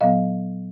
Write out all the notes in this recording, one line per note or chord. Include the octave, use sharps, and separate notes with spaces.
A#2 F#3 B3 D#5 F5